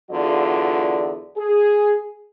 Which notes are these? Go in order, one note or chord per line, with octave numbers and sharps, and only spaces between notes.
E2 D3 F#3 F4 D5
G#4